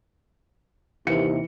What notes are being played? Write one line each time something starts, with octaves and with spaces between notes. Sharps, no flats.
D#2 C3 E3 C#7